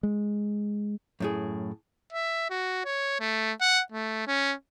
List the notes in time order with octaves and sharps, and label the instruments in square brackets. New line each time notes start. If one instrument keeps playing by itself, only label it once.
[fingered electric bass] G#3
[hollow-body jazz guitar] F#2 A2 G#4
[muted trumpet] E5
F#4
C#5
A3
F#5
A3
C#4